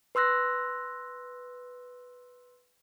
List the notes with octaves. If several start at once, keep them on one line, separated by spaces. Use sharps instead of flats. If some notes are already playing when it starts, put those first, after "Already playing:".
B4 C6 E6 F#6 A#6